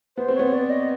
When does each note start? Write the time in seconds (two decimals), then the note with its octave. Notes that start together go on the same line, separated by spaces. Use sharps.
0.17 B3 C5
0.28 C4
0.35 B3 C#5
0.53 D5
0.70 D#5